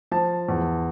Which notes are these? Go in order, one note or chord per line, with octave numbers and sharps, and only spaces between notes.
F3 A5
E2